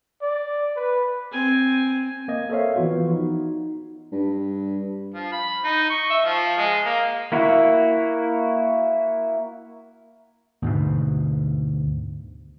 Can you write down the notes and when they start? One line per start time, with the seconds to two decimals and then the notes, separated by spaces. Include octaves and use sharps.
0.22 D5
0.76 B4
1.32 C4 G#5
2.28 A#3 D#5 G#6
2.50 A4 A#4 C5 C#5 E5 F5
2.76 E3 F3 B3 F4 F#4
3.13 D#4
4.12 G2
5.14 F3
5.32 B5
5.64 D#4
5.90 C#6
6.10 E5
6.25 F3
6.57 G#3
6.85 A#3
7.32 A#3 E4 F#4
10.62 D2 G#2 B2